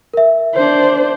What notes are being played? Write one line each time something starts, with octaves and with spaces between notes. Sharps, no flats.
A#4 E5
D4 C5